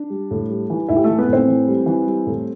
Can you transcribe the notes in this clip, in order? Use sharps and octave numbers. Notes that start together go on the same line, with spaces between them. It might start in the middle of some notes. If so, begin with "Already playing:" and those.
Already playing: D4
G3
A2
G3
E3
A2 E4 E5
G4
E3 A3 A4
B3 B4
A2 C4 C5
E3
G3
E3
G3
A2